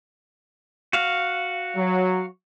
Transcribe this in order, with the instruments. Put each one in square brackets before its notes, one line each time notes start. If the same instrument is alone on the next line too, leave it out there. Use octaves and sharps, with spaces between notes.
[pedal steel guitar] F#4 F5
[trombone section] F#3